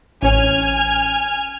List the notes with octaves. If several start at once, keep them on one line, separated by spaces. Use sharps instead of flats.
A1 C#4 G#5 F6 G#6